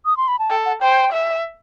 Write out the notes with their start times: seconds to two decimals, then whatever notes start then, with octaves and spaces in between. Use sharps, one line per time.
0.06 D#6
0.17 C6
0.28 B5
0.39 A5
0.50 A4 G5
0.66 F#5
0.81 C5 G5
1.13 E5